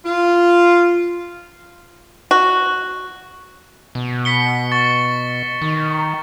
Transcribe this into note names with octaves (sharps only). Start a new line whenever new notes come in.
F4
F#4
B2
B6 C#7 G7
C#6 A6
D#3